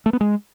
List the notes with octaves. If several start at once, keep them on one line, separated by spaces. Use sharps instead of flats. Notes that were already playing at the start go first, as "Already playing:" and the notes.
A3
B3
G#3